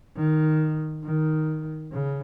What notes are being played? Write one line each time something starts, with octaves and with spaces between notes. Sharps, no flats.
D#3
D#3
C#3